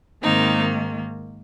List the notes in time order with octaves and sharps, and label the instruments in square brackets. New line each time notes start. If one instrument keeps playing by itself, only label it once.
[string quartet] G#2 D#3 A#3 C4 D#4